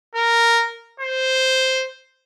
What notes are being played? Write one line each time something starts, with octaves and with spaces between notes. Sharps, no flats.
A#4
C5